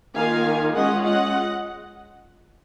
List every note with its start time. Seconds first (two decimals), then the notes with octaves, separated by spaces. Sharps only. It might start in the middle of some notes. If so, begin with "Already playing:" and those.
0.16 D#3 A#3 F4 F5 G#5
0.76 G#3 C#4 F4 D#5 F#5
1.05 D#5 F#5